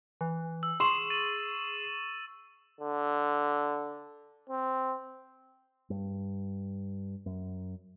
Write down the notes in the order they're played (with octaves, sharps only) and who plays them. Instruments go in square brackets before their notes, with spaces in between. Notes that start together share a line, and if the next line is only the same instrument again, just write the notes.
[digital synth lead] E3
[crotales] E6
[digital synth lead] G#4 [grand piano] C6 [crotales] C#6 E7 F#7
[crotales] A6 D#7 F#7
[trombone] D3
C4
[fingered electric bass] G2
F#2